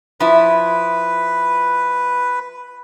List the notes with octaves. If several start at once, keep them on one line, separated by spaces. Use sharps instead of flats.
F3 E4 B4